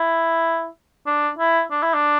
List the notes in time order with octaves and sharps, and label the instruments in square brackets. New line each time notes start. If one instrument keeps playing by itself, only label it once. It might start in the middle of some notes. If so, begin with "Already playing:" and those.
Already playing: [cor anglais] E4
D4
E4
D4
E4
D4